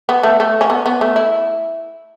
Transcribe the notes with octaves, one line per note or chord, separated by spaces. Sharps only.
B3
A3
A3
C#4
B3
B3
A3
E4